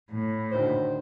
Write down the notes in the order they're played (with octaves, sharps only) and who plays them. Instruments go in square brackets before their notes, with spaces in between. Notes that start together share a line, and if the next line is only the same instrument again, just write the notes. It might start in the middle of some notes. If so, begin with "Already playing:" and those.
[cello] A2
[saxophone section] D2 D#3 C5